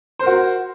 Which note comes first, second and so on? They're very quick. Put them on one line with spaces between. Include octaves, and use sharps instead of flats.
C5 A#4 F#4